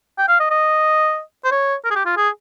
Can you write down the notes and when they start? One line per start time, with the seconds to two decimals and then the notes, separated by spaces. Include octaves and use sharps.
0.18 G5
0.29 F5
0.40 D#5
0.51 D#5
1.45 C5
1.52 C#5
1.85 A#4
1.91 G#4
1.96 G4
2.06 F4
2.17 G#4